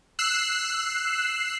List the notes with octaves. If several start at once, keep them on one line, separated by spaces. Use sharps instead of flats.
E6 F#6 C7